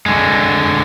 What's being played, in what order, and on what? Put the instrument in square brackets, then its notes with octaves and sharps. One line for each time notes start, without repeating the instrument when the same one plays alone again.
[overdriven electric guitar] D3 G#3